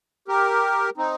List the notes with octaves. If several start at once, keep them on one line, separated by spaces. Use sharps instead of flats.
G4 A#4
C4 D#4